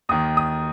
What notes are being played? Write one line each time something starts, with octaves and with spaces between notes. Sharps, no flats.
D#2 D#3 D#6
D#6